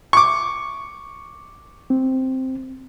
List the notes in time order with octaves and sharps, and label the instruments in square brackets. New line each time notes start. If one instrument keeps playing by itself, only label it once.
[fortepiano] C#6 D6
[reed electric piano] C4